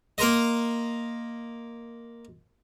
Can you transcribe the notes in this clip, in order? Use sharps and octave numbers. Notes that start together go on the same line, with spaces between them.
A#3 A#4 C5 D#5